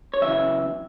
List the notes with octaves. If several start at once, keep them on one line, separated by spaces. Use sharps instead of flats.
C#5
F#2 C#3 E3 E5